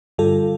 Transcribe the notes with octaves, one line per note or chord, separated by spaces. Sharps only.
G2 D3 G3 F4 A4